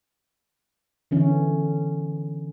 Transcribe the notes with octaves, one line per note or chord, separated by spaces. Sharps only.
D3 E3 C#4